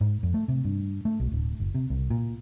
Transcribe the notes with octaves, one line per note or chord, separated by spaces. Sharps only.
G#2
F2
A3
C3
G2
A3
B1
D1
F#1
C3
C2
A#2